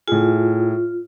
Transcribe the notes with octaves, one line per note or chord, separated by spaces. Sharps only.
A2 F4 G#4